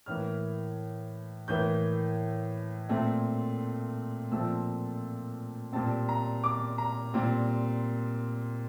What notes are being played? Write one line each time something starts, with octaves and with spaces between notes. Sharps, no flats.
A2 E3 A#3 F6
A2 E3 A#3 G6
A#2 A3 C4
A#2 F3 A3 C4 E6
A#2 G3 C4 A5
A#5
D6
A#5
A#2 G3 C4